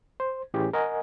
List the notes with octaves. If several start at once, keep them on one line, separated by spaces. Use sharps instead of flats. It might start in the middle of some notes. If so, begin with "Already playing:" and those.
C5
A2 E3 C#4 G4 G#4
A#4 D#5 F#5 G#5